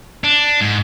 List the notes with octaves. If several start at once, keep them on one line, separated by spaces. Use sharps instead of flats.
D4
G#2